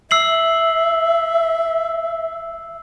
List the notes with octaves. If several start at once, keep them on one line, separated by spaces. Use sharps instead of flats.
E5 E6 C7 F#7